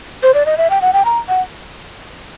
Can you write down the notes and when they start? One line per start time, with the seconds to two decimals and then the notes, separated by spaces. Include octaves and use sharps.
0.23 C5
0.34 D5
0.46 D#5
0.58 E5
0.70 G5
0.82 F#5
0.93 G5
1.05 A#5
1.28 F#5